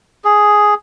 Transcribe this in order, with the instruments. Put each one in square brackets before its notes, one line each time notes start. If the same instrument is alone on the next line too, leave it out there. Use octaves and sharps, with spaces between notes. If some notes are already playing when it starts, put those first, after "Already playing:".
[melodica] G#4